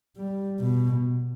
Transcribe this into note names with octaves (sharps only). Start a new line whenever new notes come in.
G3
B2